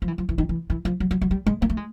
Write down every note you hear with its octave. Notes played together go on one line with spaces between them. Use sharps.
F3
E3
F3
E3
D#3
E3
E3
F3
F#3
F#3
F#3
G3
G#3
A#3
A3
G#3